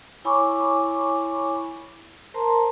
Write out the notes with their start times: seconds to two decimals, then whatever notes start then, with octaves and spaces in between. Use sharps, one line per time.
0.25 E4 C#5 G#5 B5 C#6 D6
2.34 A#4 C5 A5 A#5 C6